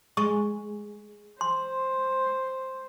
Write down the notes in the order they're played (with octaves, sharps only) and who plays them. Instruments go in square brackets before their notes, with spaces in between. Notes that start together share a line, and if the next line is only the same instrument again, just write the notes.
[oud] G#3 [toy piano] C#6
[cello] C5 [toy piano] C6